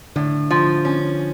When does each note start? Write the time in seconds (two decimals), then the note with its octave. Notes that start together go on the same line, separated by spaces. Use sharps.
0.16 A2 D3
0.51 F3
0.85 C#4